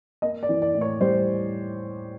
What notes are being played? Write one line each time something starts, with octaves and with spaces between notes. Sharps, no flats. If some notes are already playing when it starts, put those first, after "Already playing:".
A#3 D#5
D5
E3
D5
A2
C#5
G3 C5